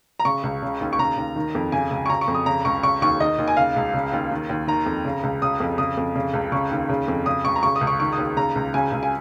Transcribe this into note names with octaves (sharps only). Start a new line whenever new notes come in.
A#5
C#3 C#6
C#2
C#3
D#2
C#6
C#3 A#5
D#2
D#3
F2
C#3 G#5
C#2
C#6
C#3 A#5
C#6
F2
D#6
C#3 A#5
C#2 C#6
C#3 C#6
D#2 C#6
D#3 D#5
D#2
G#5
C#3 F5
C#2
C#3
D#2
D#3
D#2
D#3 A#5
F2
C#3
C#2
C#3 D#6
F2
C#3 D#6
F2
C#3
C#2
C#3 C#6
D#2
C#3
F2
C#3 D#6
C#2 C#6
A#5
C#3 C#6
D#6
C#2
C#6
D#3 C#6
D#6
D#2
C#3 A#5
C#2
C#3 G#5
C#2
G#5